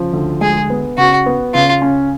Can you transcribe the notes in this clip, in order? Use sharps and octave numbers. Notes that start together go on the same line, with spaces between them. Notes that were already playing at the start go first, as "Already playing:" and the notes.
Already playing: C#3 F3
D2
G#3 G#4
B3
C#3 F#4
B3
C#3 F4
C#4